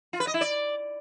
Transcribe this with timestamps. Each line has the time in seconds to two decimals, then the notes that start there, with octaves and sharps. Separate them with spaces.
0.13 F4
0.20 B4
0.27 D#5
0.34 E4
0.41 D5